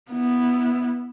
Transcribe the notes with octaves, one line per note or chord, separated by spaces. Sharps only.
B3 E4